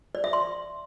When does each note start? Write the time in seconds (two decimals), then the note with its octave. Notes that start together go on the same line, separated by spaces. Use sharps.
0.15 D5
0.24 E5
0.33 C6